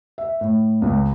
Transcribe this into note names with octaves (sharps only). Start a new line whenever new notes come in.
E5
A2
C#2